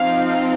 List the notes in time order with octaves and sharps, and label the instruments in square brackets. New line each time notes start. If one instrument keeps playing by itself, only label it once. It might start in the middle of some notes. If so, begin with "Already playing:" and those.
Already playing: [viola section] F3 C4 D#4 F5